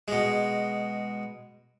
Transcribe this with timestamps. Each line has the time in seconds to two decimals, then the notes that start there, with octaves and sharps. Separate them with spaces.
0.08 B2 G#3